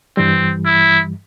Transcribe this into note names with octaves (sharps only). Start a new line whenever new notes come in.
G2 E3 G3 C4
E4